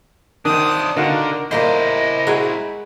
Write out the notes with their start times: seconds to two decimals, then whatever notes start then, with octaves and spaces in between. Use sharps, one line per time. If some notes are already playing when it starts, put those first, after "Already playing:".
0.45 D#3 D4 C5 D#6
0.96 D3 D#4 F4 F#4 A#4
1.51 A#2 A#3 E4 C5 D#5 C6
2.27 G#3 F#4 G#5 A#5